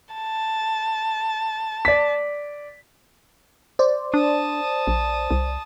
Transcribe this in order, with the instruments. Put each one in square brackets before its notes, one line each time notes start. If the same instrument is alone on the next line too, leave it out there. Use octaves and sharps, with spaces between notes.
[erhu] A5
[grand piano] D5 B6
[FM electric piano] C5 D5
[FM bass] D4 [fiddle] A5 D#6
[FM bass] A#1
C2